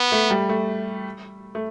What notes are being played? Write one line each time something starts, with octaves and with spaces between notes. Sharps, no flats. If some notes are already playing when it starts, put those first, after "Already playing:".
Already playing: B3
A3
G3
A3
A3